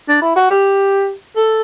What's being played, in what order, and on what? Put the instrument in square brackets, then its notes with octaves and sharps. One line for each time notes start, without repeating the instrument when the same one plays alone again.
[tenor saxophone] D4
E4
F#4
G4
A4